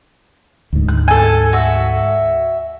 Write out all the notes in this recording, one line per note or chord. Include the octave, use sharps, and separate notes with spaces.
D2 G#2
F#6
A4 G#5
F#4 E5